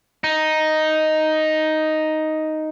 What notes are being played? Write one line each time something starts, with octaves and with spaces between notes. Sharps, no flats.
D#4